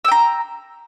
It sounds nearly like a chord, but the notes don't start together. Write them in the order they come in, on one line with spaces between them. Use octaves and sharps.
E6 G5 A#5